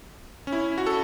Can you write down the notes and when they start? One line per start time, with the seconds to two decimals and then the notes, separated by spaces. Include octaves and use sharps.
0.47 C#4
0.52 E4
0.78 F#4
0.87 A4